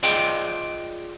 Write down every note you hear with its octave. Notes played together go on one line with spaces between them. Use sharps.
F4 G#4 C5 D5 D#5 G5